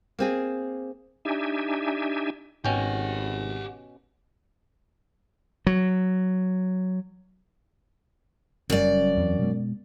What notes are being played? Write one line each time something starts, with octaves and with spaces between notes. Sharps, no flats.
A#3 C4 G#4
D4 D#4 G4 E5 G#5
G#1 G#2 B2 C#4 G4 F#5 G5
F#3
F#1 F#2 G3 C#4 D5
E2 A#3 C4
B2 G#3 B3